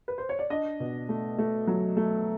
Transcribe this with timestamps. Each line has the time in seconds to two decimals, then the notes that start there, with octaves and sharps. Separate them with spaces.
0.08 B4
0.18 C5
0.29 C#5
0.39 D5
0.50 D4 D#5
0.80 B2
1.09 A3
1.38 A3
1.67 F#3
1.97 A3